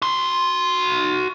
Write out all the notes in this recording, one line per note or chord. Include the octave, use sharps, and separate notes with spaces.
F#4 C6